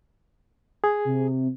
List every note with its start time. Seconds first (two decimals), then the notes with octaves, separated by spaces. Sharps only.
0.84 G#4
1.05 C3